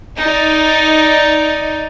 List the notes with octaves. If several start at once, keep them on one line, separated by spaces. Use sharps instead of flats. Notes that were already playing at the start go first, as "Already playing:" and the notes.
D#4 D5